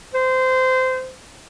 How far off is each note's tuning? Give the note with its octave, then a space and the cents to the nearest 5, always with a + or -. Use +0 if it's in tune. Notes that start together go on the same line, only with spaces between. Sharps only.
C5 -20